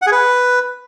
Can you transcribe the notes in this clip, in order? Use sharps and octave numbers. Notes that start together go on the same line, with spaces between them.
F#5
G#4
B4